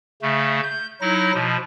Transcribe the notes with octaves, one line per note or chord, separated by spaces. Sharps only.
C#3 A3
G6
F#3 D#4 E4 A#6
B2 F3